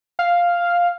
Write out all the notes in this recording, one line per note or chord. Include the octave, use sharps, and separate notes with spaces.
F5